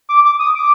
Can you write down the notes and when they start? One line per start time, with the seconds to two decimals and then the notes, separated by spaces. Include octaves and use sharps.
0.09 D6
0.24 D6
0.39 D#6
0.55 D6